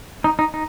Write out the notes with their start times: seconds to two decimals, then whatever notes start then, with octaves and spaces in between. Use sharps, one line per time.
0.24 D#4
0.39 D#4
0.54 D#4